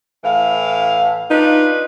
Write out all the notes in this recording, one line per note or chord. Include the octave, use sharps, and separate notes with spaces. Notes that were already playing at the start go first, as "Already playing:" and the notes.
A2 E3 F5
D4 D#4 F4 B4